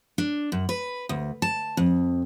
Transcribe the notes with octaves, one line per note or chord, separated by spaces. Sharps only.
D4
F#2
B4
D2
A5
F2